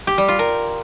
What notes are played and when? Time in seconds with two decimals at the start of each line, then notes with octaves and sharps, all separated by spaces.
0.07 G4
0.18 G3
0.28 F4
0.39 A#4